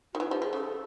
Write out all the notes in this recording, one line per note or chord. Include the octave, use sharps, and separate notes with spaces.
D#3 F#4
E3 F4
F3 G4
F3 G#4
C#3 A4